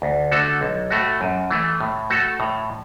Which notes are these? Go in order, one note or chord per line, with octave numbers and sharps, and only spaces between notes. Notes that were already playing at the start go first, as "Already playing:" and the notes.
D2
D3 A3 F#4 A4
B1
A2 A3 F#4
F#2
E3 A3
A2
A3 F#4 A4
A2